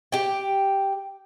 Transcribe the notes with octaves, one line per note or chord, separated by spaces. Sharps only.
G4 G5